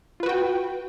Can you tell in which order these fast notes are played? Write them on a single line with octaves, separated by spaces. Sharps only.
F4 B4 F#4 G5